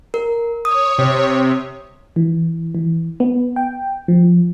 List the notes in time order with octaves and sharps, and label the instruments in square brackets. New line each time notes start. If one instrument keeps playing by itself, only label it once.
[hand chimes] A#4
[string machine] C#5 [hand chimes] D#6
[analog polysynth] C3
[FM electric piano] E3
E3
B3
G5
F3